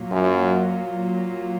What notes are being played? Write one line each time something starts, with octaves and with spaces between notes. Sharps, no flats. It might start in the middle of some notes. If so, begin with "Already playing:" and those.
Already playing: A#2 F#3 A#3 F4
F#2